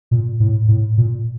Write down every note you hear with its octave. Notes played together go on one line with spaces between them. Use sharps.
A#2
A2
A2
A#2